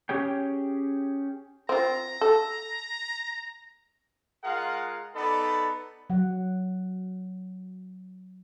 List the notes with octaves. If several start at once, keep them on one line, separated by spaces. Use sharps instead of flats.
C#4 G4 G#4 C#5 G5
C4 F4 A#5
A4
G#3 F4 G#4 A#4 F5 F#5
B3 D#4 A4 D5 B5
F#3 F#5